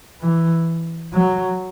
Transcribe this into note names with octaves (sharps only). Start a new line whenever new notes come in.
E3
F#3